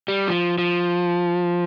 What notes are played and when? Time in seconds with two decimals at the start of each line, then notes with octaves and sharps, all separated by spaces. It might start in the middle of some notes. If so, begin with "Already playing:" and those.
0.08 G3
0.28 F3
0.58 F3